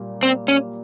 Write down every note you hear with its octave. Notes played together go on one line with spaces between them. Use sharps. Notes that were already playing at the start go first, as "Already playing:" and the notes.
Already playing: A#2 G3 A#3
C4
C#4